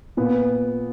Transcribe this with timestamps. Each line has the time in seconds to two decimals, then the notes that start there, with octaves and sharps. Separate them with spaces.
0.17 A#2 B3